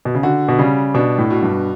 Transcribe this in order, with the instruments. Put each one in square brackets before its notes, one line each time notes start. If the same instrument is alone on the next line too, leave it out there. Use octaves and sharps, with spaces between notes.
[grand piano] B2
C#3
[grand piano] D3 [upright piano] F#4
[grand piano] B2
[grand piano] C#3 [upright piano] G3
[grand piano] B2 [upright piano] D4
[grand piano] A2
[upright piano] B2
[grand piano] G2